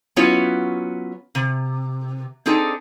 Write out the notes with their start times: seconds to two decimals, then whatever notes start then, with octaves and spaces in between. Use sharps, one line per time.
0.16 F#3 B3 C#4 E4 F4 C#5
1.35 C3
2.46 C4 D4 D#4 G#4 A4